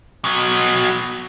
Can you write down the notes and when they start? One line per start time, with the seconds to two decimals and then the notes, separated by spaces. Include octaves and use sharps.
0.25 B2 F#3